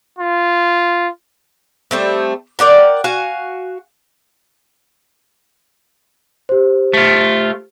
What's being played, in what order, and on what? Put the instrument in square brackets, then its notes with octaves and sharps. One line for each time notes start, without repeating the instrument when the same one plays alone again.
[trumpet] F4
[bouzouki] G3 A3 C4
A#4 D5 F#5 G5
F#4 F5 G#5
[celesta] G4 C5
[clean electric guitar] A3 F4